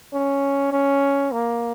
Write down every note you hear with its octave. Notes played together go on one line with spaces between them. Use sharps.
C#4
C#4
A#3